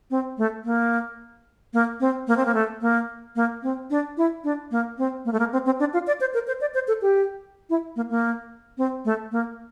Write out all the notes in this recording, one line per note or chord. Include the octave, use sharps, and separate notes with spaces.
C4
A3
A#3
A#3
C4
A#3
C4
A#3
A3
A#3
A#3
C4
D4
E4
D4
A#3
C4
A#3
A3
A#3
C4
C4
D4
F4
D5
C5
A#4
C5
D5
C5
A4
G4
E4
A#3
A#3
C4
A3
A#3